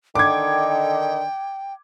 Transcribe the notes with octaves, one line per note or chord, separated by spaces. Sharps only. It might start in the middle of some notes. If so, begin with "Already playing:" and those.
D3 D#3 G5 D6 G#6